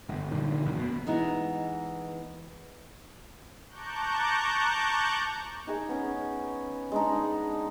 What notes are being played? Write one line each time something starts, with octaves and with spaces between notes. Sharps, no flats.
G1
A#2 D3 D#3
E1 A1 F#2
B2
E3 G#3 B3 D#4 G#4
A5 A#5 C#6 D6 F#6 G6
D#4 G#4 D#5
B3 C#4 C#5
G#3 D4 D#4